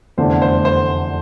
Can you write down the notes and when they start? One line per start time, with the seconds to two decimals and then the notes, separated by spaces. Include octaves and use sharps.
0.17 F1 E2 D3 A3 D4 C5
0.42 C5
0.65 C5